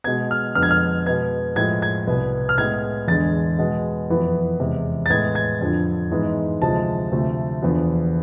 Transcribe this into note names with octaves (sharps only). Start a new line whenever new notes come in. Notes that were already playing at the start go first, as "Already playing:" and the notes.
B2 G#3 B3 G#6
F6
F2 D3 G#3 B3 F6
G#6
F6
B2 G#3 B3 G#6
A2 F3 G#3 G#6
G#6
C2 B2 B3
F6
A2 G#3 B3 G#6
E2 D3 G#3 A6
B2 G#3 B3
F2 E3 B3
E2 C3 G#3
A6
A2 G#3 B3 G#6
G#6
F2 D3 F3
G#2 E3 G#3 B3
D2 C3 F3 G#3 A5
D2 C3 F3 A3
E2 D3 F3 B3